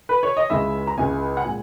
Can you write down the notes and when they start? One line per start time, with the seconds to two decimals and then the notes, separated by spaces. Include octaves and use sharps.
0.09 B4
0.23 C#5
0.37 D#5
0.50 C#2 C#3 G#3 C#4 E4 E5
0.87 A#5
0.98 C#2 C#3 G#3 C#4 E4 G#5
1.37 F#5
1.45 A#2 G#3 G#5